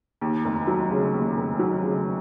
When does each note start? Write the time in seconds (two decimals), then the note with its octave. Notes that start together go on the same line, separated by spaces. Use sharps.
0.21 D#2
0.44 F1
0.67 F#3
0.90 C#3
1.13 D#2
1.37 F1
1.59 F#3
1.82 C#3